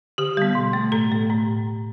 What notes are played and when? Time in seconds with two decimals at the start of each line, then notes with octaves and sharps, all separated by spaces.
0.18 D3 G4
0.37 G3 B3
0.55 B2
0.73 A3
0.92 A2 A4
1.11 A3
1.30 A2